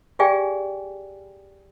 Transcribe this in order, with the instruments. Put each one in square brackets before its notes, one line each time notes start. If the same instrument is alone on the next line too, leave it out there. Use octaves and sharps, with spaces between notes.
[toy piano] G4 G#4 D5 F5 G5 G#5